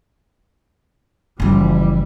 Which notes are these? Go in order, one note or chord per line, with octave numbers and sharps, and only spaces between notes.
F#1 E3 F3 G3